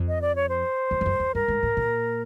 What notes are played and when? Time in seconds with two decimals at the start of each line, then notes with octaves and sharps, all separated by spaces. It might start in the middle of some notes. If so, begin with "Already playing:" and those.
Already playing: F2
0.08 D#5
0.22 D5
0.36 C#5
0.49 C5
0.91 F2
1.01 F2
1.06 F#2
1.20 F2
1.35 G2 A#4
1.48 G#2
1.63 A2
1.77 A#2